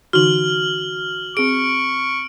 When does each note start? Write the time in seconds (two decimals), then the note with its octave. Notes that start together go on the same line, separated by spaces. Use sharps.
0.13 D3 E3 D#4 F#4 F6 F#7
1.37 C4 G#4 C#6 D7